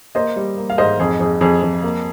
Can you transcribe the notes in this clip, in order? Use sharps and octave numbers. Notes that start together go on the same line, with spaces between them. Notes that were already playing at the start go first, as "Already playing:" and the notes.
A#3 C5 D#5
G3
A#3
F5
G#2 C5 D#5
F2 G#4
F2 G#4
F2 G#4
F2
A#3